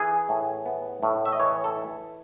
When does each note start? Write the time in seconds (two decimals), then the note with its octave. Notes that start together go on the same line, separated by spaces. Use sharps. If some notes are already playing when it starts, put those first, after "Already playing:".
Already playing: E3 G#4
0.29 A2
0.66 B3
1.03 A2
1.26 E5
1.32 D#5
1.40 E3 C#5
1.64 A4
1.76 E4